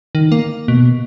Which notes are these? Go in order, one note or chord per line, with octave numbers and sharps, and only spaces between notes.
D#3
A#3
B2